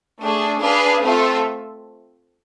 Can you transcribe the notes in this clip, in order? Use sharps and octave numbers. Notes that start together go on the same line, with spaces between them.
A3 D4 G#4
D4 G#4 B4 F5 A5
A3 C4 F4 A4 E5